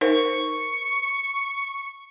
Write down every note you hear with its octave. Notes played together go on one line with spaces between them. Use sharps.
D#4 A#4 C5 C#6